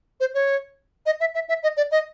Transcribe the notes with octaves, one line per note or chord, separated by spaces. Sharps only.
C5
C#5
D#5
E5
E5
E5
D#5
D5
D#5